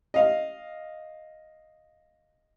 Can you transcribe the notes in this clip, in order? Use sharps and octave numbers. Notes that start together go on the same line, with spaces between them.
D#5 F5